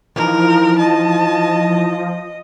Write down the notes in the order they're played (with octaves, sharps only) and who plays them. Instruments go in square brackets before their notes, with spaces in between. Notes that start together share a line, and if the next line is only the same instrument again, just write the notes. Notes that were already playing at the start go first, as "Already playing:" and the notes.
[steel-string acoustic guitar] E3 D#4 [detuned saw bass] F3 [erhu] A#4
[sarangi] D#5 [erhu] A5